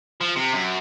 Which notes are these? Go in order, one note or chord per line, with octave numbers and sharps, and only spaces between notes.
F3
C3
F#2